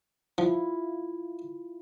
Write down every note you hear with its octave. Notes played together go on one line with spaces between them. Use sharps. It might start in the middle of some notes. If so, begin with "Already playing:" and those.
F3 E4 F4